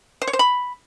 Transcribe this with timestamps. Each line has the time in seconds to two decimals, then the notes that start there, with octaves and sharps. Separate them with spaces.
0.22 C5
0.27 C#5
0.33 C5
0.39 B5